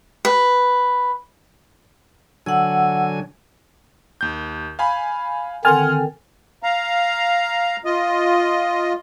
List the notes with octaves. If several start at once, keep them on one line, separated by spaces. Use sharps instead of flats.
B4
D3 F#3 F#5 G#5 E6
D#2 G6
F5 G#5 B5
D3 D#3 C4 F#5 G#5 C6 F6 A6
F5 A#5
F4 D#5